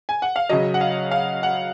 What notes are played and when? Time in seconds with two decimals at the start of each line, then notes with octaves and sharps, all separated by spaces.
0.09 G#5
0.22 F#5
0.36 F5
0.50 C#3 F#3 D#5
0.74 F#5
0.81 F5
1.11 F5
1.43 F#5